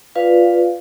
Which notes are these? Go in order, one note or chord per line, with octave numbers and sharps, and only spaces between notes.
F4 B4 D5 F5